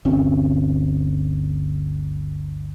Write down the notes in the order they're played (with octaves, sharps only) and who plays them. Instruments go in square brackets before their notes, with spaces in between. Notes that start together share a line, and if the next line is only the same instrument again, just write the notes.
[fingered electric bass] G1 D2 C4 C#4